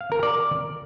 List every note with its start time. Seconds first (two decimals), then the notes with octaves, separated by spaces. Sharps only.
0.01 F5
0.12 A#4
0.23 D5